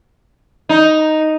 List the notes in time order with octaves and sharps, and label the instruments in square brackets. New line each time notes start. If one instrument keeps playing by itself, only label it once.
[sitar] D#4